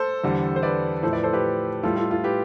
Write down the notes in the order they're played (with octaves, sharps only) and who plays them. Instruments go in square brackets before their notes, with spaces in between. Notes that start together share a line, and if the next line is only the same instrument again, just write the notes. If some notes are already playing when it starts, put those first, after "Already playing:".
Already playing: [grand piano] A4 C5
E2 D3 G3
C5
B4 D5
A2 F3 A4 C5
B4 D5
A4 C5
G4 B4
A2 G3 F4 A4
F4 A4
F4 A4
G4 B4